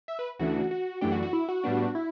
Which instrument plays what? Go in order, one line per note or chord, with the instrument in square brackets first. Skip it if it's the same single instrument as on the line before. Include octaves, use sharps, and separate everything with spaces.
[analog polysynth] E5
B4
D2 C#3 E3 A3 D4 F#4
F#4
F#2 E3 A3 D4 G4
F#4
F#4
E4
F#4
A2 G3 B3 D4
E4